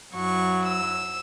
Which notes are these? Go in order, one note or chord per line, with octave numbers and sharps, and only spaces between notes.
F#2 F#3 E4 C#6
E6